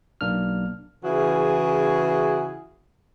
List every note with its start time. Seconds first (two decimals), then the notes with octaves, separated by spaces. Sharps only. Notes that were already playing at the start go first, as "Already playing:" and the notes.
0.21 B1 A#3 D4 F6
1.04 C#3 E3 E4 F#4 G#4